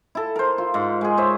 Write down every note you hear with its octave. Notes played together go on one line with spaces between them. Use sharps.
E4 A4
A#4 C5
F4
G#2
G#3 G#4
C5 C#5 E5